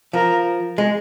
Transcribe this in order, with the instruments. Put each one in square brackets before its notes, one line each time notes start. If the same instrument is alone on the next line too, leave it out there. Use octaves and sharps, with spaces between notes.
[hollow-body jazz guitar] F3 [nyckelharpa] A#4
[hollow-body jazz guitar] G#3